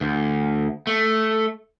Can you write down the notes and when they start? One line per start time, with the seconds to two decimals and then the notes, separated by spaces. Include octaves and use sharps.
0.01 D2
0.87 A3